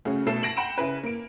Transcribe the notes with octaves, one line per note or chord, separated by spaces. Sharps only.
C#3 A3 C#4 F#4 G#4
B2 A3 A4 C7 E7
A5 A#6 D7 F#7
F#5 G5 B5 D7 E7
C#3 E4 G#4 B4
A#3 D7